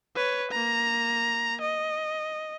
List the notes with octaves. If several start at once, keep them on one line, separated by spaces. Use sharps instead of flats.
B4 C#5
A#3 A#5
D#5